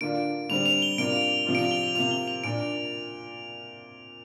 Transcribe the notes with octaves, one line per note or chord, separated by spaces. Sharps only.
D3 A#3 D4 F4 D7
D3 G3 C4 F7
F7
G7
C3 A#3 D4 F4 D7
C3 F3 D4 F4
D7
F7
G7
F7
C3 A#3 F4 F7
G7
F7
A#2 A#3 D4 D7